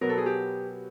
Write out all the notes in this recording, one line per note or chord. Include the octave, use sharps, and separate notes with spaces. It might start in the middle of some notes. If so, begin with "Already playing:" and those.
B2 F#3 B3 A#4
A4
G#4
G4